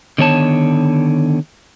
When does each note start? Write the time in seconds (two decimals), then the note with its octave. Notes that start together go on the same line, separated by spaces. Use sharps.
0.18 D3 D#3 B3 C#5 D#5 A5